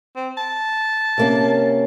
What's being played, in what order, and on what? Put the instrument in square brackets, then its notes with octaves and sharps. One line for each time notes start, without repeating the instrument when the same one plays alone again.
[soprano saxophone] C4
A5
[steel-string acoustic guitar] C3 A#3 C#4